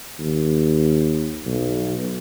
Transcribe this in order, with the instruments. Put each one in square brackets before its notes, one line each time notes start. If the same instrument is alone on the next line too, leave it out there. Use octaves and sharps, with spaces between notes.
[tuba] D#2
B1